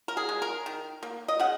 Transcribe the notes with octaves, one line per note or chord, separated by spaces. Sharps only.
A#4
G#4
G#3
A#4
D#3
A#3
D#5
C#3 F#5